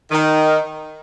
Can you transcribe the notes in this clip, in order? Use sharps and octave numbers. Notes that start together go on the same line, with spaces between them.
D#3